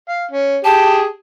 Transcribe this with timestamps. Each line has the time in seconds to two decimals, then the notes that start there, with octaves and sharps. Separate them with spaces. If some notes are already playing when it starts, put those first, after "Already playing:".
0.08 F5
0.31 C#4
0.64 G4 G#4 A5